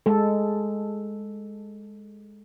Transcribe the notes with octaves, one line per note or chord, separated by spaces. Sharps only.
G#3 A4